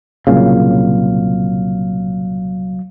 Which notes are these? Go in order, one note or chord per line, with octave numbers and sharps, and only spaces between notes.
C2 A#2 C#3 F#3 F5